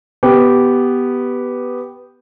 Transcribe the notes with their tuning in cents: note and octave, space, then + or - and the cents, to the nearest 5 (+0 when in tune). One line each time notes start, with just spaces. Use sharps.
B3 +0 G4 -5